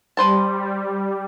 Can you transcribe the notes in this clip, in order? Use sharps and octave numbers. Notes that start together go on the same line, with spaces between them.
G3 B4 C5 A5